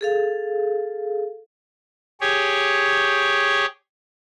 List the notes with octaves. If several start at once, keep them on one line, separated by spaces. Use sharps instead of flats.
G#4 A4 F5
G4 G#4 C#5